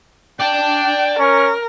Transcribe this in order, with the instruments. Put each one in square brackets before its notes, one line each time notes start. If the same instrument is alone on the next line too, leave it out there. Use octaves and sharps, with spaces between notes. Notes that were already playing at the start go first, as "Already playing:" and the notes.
[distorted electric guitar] D5 A5 [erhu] G5
[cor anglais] C#4 [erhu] A#4